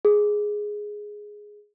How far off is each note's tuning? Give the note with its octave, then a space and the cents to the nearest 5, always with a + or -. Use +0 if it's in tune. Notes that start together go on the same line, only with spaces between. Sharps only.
G#4 +5